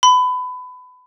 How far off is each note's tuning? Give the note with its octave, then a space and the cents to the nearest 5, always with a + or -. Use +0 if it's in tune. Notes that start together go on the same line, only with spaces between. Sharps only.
B5 +25